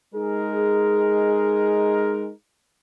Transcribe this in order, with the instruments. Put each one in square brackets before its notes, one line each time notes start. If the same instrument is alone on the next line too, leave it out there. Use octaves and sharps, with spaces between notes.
[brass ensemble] G#3 D#4 G#4 A#4